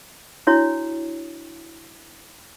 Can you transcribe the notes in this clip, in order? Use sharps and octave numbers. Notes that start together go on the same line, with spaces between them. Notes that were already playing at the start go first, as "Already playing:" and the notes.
D4 E4 F#4 C#5